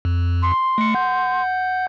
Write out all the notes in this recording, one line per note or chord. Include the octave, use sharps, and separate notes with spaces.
F2
C6
A3 C#7
F#5 G6